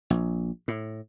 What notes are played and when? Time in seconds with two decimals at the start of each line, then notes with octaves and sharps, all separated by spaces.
0.10 A#1
0.68 A2